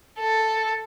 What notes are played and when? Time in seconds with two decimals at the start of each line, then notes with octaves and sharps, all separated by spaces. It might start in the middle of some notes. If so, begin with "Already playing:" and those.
0.19 A4